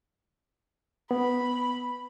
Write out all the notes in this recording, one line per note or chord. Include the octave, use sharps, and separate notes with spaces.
B3 B5